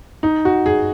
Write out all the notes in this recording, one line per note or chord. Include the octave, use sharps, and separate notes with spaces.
D#4
F#4
G#4